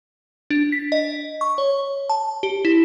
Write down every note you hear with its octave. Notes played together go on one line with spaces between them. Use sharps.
D4
B6
D#5
C#6
C#5
A5
G4
E4